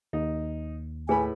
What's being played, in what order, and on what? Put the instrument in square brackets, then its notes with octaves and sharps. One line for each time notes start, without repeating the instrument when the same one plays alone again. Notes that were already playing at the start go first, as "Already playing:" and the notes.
[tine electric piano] D#2 [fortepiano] D#4
[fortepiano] A2 B5 [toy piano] G#4 B4 [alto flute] G#5